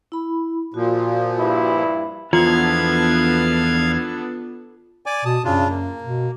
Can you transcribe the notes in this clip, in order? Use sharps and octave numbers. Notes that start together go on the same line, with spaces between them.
E4 B5
A#2 F3 F#4
G2 E4
E2 F3 B3 D4 F4 A4 F5 G#6
D5 G#5 D6
B2 A5 D#6
F#2 C#3 D4 F4
A#3
B2